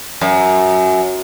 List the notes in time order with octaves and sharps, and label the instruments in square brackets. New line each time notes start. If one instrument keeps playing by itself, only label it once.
[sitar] F#2